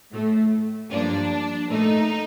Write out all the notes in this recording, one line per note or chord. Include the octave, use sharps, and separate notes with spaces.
A2 A3
G2 F3 A#3 D4
A#2 A3 D#4